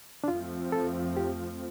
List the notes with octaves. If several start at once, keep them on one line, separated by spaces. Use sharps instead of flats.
D4
F2 F3 A3 C4 F4
A4
G4